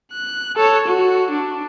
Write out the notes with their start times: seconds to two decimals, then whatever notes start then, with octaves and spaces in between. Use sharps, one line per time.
0.13 F#6
0.56 A4 C#5
0.88 F#4
1.31 D4